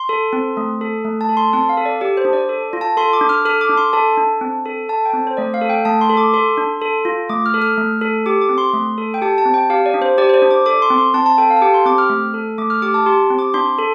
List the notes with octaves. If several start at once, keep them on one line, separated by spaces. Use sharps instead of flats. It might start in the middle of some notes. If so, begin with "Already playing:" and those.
Already playing: C6
A4
C4
A3
A4
A3
A5
A4
C6
C4 A5
F5
A4
D5
G4 D5
C5
D4
D5
A4
F4
A5
A4 C6
D6
D4
F6
A4 F6
D6
D4
C6
A4 A5
D4
C4
A4
A4 A5
G5
C4
C5
A3 D5
F5
A4
G5
A3 A5
C6
A4
D6
A4 C6
D4
A4
F4
A3 D6
F6
A4
F6
A3
A4
G4 D6
D6
C4
C6
A3
A4
G5
G4 A5
A5
C4
G5
G4 F5
D5
D4
C5
G4 D5
C5
D5
D4
D6
A4 D6
C6
C4
C6
C4 A5
A5
A4 G5
F5
A5
G4 G5
C6
C4 D6
F6
A3
A4
A3 D6
F6
G4 D6
A5
G4 C6
C4
D6
D4 C6
A4